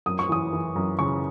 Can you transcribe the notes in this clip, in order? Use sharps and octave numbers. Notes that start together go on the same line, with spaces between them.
F#2 D#6
C#6
E3 D#6
E3
F#2
C#3 C#6